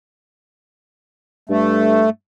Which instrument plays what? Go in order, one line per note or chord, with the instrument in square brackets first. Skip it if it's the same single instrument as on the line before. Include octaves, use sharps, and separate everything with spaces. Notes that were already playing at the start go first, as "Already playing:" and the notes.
[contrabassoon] G2 [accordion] A3